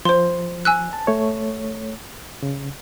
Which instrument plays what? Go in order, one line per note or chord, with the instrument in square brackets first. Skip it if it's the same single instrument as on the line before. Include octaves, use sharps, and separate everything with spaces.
[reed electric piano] F3 [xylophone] C5 C6
[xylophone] G#5 E6 F#6
[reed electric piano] A5
A3 C#5
C#3